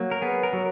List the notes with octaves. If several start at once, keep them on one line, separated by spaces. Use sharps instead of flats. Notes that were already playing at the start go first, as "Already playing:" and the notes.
Already playing: F#3 A#3
A#4
B3 G#4
A#4
F#3